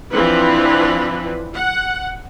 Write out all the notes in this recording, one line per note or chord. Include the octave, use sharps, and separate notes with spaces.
E3 F3 C4 D4 B4
F#5